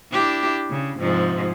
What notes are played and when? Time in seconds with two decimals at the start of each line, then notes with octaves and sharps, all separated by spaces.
0.12 D4 E4 G4
0.70 C#3
0.99 G#2 C3 F3